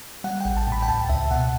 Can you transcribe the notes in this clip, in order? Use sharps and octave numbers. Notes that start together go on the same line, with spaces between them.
G3 F#5
A1 G5
A5
A2 B5
G5
C#2 A5
C#2 E5
B2 F#5